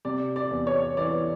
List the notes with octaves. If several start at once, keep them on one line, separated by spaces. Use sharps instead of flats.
C3 D5
D5
E2
C#5
E3 D5